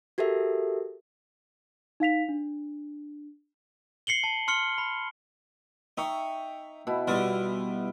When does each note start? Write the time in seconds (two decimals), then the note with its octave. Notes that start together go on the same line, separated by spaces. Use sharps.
0.18 F#4 G4 A4 A#4 E5
2.00 D#4 F5 B6 F7
2.29 D4
4.07 C7 C#7 F#7 G7
4.24 A5
4.48 C6 F6 C#7 G7
4.78 B5
5.98 D#4 E5 G5 C#6
6.87 B2 E4
7.07 B2 G3 E4 F4